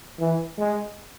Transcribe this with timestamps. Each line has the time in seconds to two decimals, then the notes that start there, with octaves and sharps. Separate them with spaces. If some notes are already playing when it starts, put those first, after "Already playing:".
0.20 E3
0.59 G#3